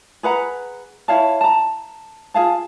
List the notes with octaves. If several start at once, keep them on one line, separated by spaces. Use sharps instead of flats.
G#4 B4 F#5 A#5
E4 C#5 F5 A5
A5 A#5
F4 G#4 F5 A5